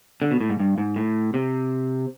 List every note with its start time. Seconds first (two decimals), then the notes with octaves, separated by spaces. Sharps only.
0.22 D3
0.31 B2
0.40 A2
0.50 G#2
0.60 G2
0.78 G#2
0.96 A2
1.34 C3